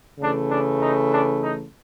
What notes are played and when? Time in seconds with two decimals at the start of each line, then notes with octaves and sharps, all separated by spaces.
0.20 C#3 E3 A3 D4
0.50 D4
0.81 D#4
1.11 D4
1.42 D#4